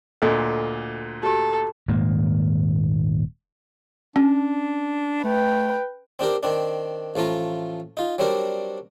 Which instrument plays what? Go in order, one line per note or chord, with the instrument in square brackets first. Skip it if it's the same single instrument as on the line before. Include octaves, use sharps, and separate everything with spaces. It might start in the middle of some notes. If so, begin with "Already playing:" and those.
[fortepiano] D2 A#2 [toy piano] A4 D#5 G#5
[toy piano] F#4 G4 [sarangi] A4
[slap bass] D#1 G#2 D#3 A#3
[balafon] C#4 [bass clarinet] D4
[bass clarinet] A3 [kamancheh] B4 G5
[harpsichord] C4 D4 G4 A#4
D#3 C4 D4
A1 F3 A3 F4 A#5
D#4 F4
F#3 G3 C4 D4 A#4